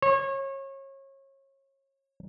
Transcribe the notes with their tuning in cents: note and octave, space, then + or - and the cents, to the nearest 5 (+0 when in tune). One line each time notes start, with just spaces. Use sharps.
C#5 -30